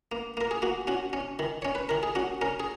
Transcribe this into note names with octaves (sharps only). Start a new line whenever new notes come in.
A#3
A#3 A#4
G#4
A#3 F#4
C#4 F#4
C#4
D#3
C#4 C#5
B4
D#3 A#4
G#4
C#4 F#4
C#4 A#4
G#4